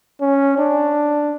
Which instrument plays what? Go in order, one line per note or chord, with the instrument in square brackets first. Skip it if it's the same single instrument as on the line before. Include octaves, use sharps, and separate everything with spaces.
[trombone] C#4
D4